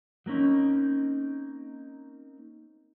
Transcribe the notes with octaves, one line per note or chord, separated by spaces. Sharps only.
F#3 A#3 C4 C#4 D#4